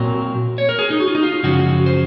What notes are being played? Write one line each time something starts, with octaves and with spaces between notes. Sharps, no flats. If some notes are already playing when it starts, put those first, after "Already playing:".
Already playing: A#2 F#3 C4 A#4
C#5
A#4
G#4
D#4
F#4
F4
D#4
F4
F#2 C#3 F3 G#3 F#4
C5